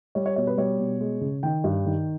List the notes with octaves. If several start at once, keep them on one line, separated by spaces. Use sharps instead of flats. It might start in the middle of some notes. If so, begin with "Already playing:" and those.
G3 C#5
C#5
B2 C#5
B4
G3 C#5
B2
G#3
C#3
D#3 G5
G2
D#3